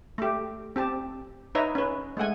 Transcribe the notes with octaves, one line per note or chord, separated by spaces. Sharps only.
A3 G4
C4 G4 A5
D#4 B4 C#5 D#5 E5 A#5
C#4 B4
G#3 A3 F#5 G#5